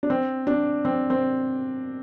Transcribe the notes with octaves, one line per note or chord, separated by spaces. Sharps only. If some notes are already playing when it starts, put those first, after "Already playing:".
D4
C4
D4
C4
C4